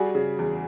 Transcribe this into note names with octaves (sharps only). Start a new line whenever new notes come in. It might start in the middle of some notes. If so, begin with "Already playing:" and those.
Already playing: G3 F#4 G#4
C#3
E2